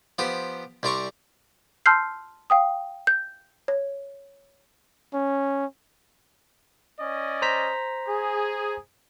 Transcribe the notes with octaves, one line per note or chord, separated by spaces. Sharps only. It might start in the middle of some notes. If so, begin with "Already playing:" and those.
F3 B3 G4 C5
C2 G3 C5 D5 A#5 C#6
A5 C6 E6 F6 G6 C7
F5 G5 D#6
G6
C#5
C#4
C#4 D5 D#5
C5 A#5 B6
G#4